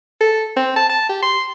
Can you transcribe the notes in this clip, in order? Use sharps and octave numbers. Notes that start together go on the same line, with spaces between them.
A4
C4
A5
A5
G4
C6